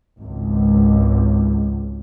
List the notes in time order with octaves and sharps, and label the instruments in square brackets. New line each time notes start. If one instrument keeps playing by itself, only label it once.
[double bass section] G#1 C#2